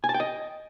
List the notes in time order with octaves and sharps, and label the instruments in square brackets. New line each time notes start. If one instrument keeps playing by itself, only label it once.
[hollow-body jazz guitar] G#5
A5
G5
D#5